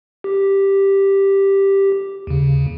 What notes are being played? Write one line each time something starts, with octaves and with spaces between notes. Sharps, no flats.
G4
D#2 C#3